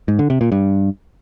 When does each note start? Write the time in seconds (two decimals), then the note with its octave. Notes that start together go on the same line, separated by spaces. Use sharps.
0.08 G#2
0.19 D3
0.30 C3
0.41 A#2
0.52 G2